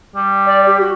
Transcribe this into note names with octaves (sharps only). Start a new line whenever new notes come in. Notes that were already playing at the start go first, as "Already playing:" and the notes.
G3
D5
G4
F#4